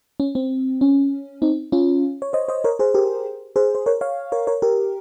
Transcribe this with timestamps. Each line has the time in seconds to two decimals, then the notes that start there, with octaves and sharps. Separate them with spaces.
0.20 C#4
0.35 C4
0.81 C#4
1.42 C4 D#4
1.72 C#4 F4
2.22 C#5
2.33 C5 D#5
2.48 C5 D#5
2.64 A#4 C#5
2.79 G#4 C5
2.94 G4 A#4
3.56 G#4 C5
3.75 C5
3.86 A#4 C#5
4.01 C#5 F5
4.32 A#4 C#5
4.47 A#4 C#5
4.62 G4 A#4